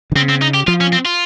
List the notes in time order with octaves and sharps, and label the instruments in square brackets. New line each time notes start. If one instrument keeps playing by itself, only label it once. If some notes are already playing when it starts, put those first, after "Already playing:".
[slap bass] D#3
[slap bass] C#3 [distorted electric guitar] C4
[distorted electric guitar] C4
D#4
G4
[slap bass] F3 [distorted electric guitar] F4
[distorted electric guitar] C#4
C4
F4